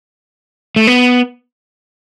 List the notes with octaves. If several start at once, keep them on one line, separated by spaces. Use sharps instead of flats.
A3
B3